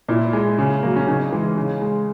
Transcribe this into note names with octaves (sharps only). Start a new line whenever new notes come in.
A#2 E4
G#3
C#3
F#3 A#3
C#4
C#3 D#4
E3 G#3
C#3
G#3